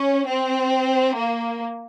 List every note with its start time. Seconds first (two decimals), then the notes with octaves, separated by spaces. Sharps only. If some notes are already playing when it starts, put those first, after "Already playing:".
Already playing: C#4
0.27 C4
1.17 A#3